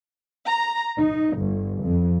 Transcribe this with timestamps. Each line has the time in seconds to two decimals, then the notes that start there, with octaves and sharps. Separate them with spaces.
0.45 A#5
0.99 D#4
1.37 G1
1.82 F2